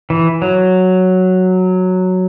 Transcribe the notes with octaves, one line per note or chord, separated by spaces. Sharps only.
E3
F#3